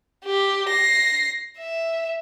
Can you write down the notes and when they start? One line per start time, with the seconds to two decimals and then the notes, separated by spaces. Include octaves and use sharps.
0.25 G4
0.69 A#6 C7
1.58 E5